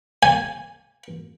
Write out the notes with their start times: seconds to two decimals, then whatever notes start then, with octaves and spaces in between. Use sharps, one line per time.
0.23 G#5